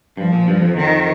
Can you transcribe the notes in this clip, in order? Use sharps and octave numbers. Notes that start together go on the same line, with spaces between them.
G2 F3
A#2
G2
F2
F2 D#3